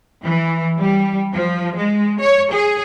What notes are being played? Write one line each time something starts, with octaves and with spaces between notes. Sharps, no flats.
E3
G3
F3
G#3
C#5
G#4